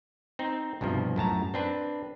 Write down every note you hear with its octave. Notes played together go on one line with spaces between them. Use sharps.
C4 D#4
C2 G2 B2 F3
F#2 A2 A5 A#5
C4 D4 B4